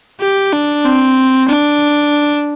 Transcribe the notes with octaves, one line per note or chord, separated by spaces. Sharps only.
G4
D4
C4
D4